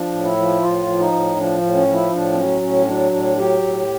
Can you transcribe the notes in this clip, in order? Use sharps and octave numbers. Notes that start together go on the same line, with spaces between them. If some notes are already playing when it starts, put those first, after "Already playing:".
Already playing: F3 D4
A2
E4
F3
A2 F4
F3
D#4
A2
F3 D4
A2
C#4
F3
E4
A2 D4
C4
F#3 C#4
A2 C#4
F#3 D4
A2 D4
F#3 G4
A2